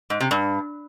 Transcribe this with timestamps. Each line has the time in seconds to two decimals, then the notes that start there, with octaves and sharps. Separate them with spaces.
0.10 G#2
0.21 C3
0.31 G2